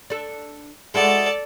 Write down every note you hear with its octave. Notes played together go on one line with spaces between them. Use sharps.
D4 A4
G#3 E4 F#4 A4 D5